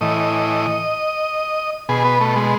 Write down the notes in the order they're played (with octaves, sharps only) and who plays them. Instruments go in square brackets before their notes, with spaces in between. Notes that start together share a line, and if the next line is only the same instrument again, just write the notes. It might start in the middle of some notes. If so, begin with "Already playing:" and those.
[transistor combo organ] A2 E3 D#5
B2 G#4
B3
A3
G#3